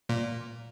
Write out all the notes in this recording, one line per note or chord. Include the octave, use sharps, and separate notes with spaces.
A#2